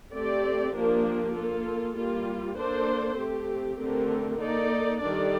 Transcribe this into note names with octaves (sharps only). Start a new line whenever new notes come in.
A3 C4 G4 D5
F3 A#3 D4 G4 A#4
A#3 F4 A4
G3 A#3 F4
A#3 D4 A4 C5
A3 C4 G4
D3 A3 C4 G4 A#4
A#3 D#4 A4 D5
D#3 G3 D4 A4 D5